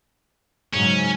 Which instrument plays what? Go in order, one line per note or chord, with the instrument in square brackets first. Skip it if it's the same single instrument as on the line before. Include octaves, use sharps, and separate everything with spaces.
[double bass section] G#2 C#3 F#3 [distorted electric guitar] C#4